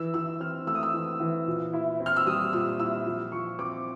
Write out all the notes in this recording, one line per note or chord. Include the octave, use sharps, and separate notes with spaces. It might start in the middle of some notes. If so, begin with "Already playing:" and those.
Already playing: E3 E6
E3 E6
C4 F6
A3 E6
D#6
E6
E3
E3
A#2
E4
C4
F6
E6
G3 D#6
A#2 E6
E4 E6
F3
F3 C#6
C4 D6